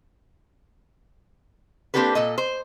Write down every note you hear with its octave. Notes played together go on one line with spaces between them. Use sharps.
A#3 C4 D4 G4 A4 B4
A#2 A4 D#5
C5